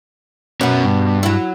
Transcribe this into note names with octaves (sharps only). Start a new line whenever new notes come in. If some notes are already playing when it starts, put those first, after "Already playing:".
B2 B3 C#4 F#4 C#5
G2
F#3 E4